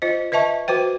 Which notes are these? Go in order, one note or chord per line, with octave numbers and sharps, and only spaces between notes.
F4 C5 D#5
B4 D#5 E5 A5 C#6
F#4 B4 C5 G5